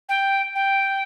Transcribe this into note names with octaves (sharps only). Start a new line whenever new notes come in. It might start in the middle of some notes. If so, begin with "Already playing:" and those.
G5
G5